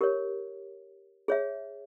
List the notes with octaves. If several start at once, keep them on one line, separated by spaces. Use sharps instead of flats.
G4 A#4 C#5
G#4 C#5 E5